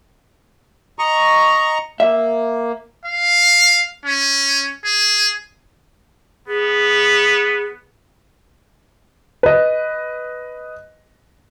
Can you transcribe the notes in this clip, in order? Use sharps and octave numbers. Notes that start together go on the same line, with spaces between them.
D#5 A#5 C#6
A#3 E5
F5
C#4
G#4
B3 G#4
B4 D#5